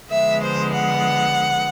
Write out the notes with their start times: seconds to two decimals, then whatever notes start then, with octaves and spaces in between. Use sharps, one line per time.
0.10 D3 F3 G#3 B3 E5
0.43 C5
0.74 F#5